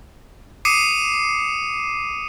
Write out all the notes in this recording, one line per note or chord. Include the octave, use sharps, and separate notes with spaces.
D6 D#6 C7 C#7 D#7 E7